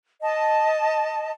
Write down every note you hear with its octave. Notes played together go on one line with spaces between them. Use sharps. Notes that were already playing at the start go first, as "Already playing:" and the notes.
D#5 A5